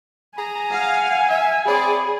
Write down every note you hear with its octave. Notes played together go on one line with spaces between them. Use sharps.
G#4 G#5 A#5
F5 F#5
E5
C4 G#4 C#5 D5 B5